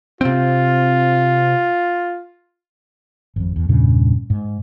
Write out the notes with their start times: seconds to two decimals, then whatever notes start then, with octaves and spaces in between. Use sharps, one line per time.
0.21 C3 C4 F4
3.36 G#1 F2
3.56 E2
3.69 E2 G2 A#2 C#3
4.30 G#2